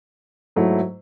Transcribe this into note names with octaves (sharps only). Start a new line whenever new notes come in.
G#2 F#3 A3 E4